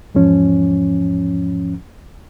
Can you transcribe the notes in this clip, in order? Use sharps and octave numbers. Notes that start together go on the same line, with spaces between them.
E2 G#2 F3 C#4